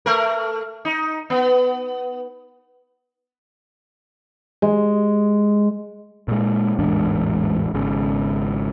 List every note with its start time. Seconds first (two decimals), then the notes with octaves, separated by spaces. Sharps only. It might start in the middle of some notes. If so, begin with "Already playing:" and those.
0.06 A3 A#4
0.85 D#4
1.30 B3
4.62 G#3
6.28 A#2 G#3
6.79 E1 A1 G#2 D4
7.74 G#1 G#2 C#3